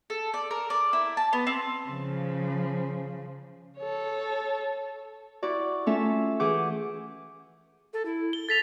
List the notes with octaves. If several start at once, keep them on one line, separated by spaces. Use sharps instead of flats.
A4
D5
A#4
D5
E4
A5
B3
C4
C#3 F3
A4 C#5
E4 F#4 D5
A3 C#4 F4 A4 E5
E3 G#4 F#5 D6 G6
A4
E4
G7
A4 A6 B6 F7